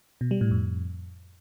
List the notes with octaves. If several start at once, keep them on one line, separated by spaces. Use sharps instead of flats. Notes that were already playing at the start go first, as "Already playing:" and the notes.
B2
G3
A2
F2